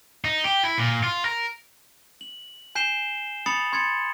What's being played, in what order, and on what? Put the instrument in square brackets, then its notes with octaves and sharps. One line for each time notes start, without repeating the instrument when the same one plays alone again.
[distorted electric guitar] D#4
G4
E4
A#2
F4
A#4
[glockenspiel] F#7
G#5 G6 C7 E7 G7
B5 D#6 A6 C#7 F7 F#7
C6 G#6 A6 C#7